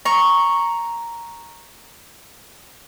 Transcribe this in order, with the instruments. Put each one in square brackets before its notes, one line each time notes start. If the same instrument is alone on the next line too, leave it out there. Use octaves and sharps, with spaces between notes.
[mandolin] A#5 C#6